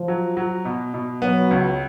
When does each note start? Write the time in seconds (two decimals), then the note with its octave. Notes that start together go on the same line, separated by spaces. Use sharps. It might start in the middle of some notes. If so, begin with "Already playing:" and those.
Already playing: F3
0.08 F#3
0.37 F#3
0.65 B2
0.94 B2
1.22 F#3 B3
1.51 C#2